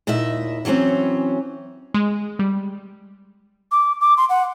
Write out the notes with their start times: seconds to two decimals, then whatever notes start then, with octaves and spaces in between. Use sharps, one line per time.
0.07 D#2 A#2 E4 D#5 E5
0.65 E3 F#3 G3 C4 C#4
1.94 G#3
2.39 G3
3.72 D6
4.01 D6
4.17 C6
4.29 F#5